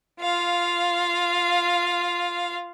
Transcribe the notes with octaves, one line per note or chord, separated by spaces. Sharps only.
F4 F5